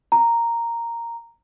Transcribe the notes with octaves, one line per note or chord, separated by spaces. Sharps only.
A#5